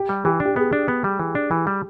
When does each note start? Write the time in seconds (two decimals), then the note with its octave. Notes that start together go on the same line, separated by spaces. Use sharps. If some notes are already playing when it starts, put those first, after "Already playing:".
Already playing: G4
0.09 G3
0.25 E3 G4
0.40 D4
0.45 G4
0.56 B3 G#4
0.73 D4
0.88 B3
1.04 G3
1.20 E3
1.35 D4
1.51 E3
1.67 G3